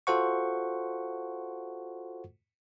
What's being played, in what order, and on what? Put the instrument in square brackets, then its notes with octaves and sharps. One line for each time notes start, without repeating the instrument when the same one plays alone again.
[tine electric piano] F4 F#4 A4 C5 F#5 C#6